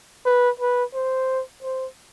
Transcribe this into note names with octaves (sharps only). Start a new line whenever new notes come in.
B4
B4
C5
C5